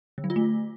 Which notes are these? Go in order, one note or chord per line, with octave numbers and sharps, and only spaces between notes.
D3
F#3
F4
A3